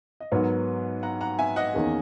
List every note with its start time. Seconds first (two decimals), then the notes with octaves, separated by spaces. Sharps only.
0.20 D#5
0.32 G#2 F#3 B3 A#4 C#5
1.03 F#5 A#5
1.21 F#5 A#5
1.39 E5 G#5
1.56 D#5 F#5
1.74 E2 D#3 A#3 C#4 G#4